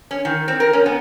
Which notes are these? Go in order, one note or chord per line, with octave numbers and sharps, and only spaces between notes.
C#4
D#3
C4
A#4
C#4
B3